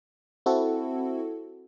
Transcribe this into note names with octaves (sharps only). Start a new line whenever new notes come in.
C4 E4 F#4 A4